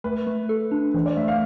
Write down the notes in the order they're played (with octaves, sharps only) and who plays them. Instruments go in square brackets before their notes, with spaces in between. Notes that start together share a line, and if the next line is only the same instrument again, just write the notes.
[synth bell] A3 [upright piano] B4
[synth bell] A3
A4
D4
[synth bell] E3 [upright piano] C5
[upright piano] D5
[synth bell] A3 [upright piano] E5
[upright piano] F5